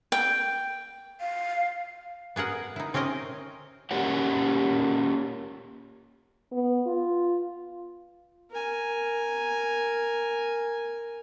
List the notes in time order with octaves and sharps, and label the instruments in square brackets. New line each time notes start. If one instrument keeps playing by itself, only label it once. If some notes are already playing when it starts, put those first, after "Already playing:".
[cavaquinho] G5
[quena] F5
[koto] B3 G#4 A#4 F#5
D#4 E4
C4 C#4 G4 A#4 D#5
[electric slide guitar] A#3 C#4 G4 A#4 C#5 F#5
[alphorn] B3
F4
[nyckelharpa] A#4 G#5